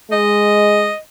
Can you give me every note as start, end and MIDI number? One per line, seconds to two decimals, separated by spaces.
0.11 0.92 56
0.11 0.97 75